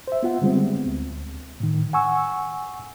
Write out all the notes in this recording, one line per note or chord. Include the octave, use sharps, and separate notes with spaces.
C5 E5
B3 F4 F#5
D3 G3 G#3 B3 C4
D2
A2 D#3
F#5 G#5 C#6 E6